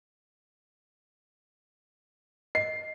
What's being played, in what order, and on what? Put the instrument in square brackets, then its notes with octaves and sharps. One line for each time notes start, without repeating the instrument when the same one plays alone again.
[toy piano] D#5 [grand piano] C7